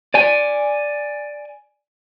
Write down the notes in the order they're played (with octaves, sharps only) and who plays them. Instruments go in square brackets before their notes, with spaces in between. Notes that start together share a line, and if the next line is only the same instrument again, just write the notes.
[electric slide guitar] D5 G#5